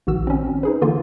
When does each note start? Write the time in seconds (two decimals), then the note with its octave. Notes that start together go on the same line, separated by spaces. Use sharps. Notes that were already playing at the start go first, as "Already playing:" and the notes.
0.07 A#1 D#3 F#4 E6
0.27 C4 C#4
0.63 D#4 G#4 B4
0.81 D3 E3 A#3 F4